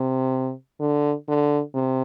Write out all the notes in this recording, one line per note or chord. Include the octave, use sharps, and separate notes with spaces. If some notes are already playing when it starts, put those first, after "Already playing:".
Already playing: C3
D3
D3
C3